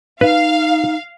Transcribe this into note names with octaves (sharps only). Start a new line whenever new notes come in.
D#4 B4 F5